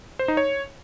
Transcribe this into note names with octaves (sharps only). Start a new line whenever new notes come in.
C5
D#4
C#5